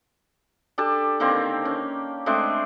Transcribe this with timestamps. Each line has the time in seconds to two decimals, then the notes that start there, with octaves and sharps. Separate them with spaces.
0.78 D4 G4 A4 A5
1.20 D3 D#3 A#3 C4
1.65 C#4
2.26 G#3 A3 C4 D4